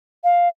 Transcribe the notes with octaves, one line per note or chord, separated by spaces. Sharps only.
F5